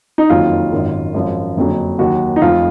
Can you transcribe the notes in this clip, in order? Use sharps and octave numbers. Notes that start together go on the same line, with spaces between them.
D#4
F#1 F2 D#3 F#3 F4
G#1 F#2 D#3
G#1 F#2 F3
F#1 F2 D3 F#3
D#2 D#3 F#3 F#4
D#4
F1 F2 F3 F4